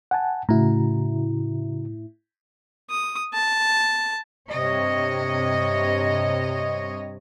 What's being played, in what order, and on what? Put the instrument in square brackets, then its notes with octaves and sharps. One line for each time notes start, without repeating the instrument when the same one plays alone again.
[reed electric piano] F#5 G#5 A5
[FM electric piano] A2 E4 [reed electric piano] C#3 F#4 A#5
[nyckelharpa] D#6
A5
[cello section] G2 C3 C#5 D#5